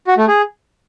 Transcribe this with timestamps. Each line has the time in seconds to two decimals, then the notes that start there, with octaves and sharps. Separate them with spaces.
0.07 F#4
0.18 A3
0.28 G#4